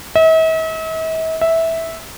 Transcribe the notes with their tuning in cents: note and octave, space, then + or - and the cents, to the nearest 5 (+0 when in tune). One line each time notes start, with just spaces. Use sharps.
E5 -45
E5 -10